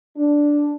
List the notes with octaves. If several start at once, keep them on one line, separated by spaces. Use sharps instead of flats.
D4